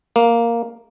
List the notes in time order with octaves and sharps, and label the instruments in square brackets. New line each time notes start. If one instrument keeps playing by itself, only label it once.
[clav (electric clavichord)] A#3